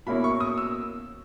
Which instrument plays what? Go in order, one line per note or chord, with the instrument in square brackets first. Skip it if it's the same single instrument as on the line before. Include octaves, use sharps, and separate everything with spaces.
[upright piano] B2 A#3 C#4 E4 B5
C#6
D#6
E6